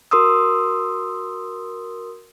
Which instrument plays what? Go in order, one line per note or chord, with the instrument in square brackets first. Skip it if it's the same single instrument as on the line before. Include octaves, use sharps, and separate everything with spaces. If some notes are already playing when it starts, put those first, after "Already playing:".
[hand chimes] F#4 A#4 C6 D#6 E6